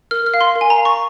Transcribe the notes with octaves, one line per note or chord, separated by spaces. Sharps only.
A#4 F6
F6
F5
C6
A#4
G#5
A#5
F5
C#6